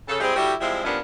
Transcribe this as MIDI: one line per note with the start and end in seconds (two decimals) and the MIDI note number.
0.08 0.20 49
0.08 0.20 69
0.20 0.35 55
0.20 0.35 56
0.20 0.35 60
0.20 0.35 64
0.20 0.35 67
0.20 0.35 68
0.36 0.54 50
0.36 0.54 55
0.36 0.54 64
0.36 0.54 66
0.36 0.54 67
0.60 0.83 53
0.60 0.83 55
0.60 0.83 56
0.60 0.83 60
0.60 0.83 64
0.85 0.99 48
0.85 0.99 53
0.85 0.99 58
0.85 0.99 59
0.85 0.99 61
0.85 0.99 62